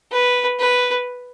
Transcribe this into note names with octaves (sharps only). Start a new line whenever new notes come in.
B4
B4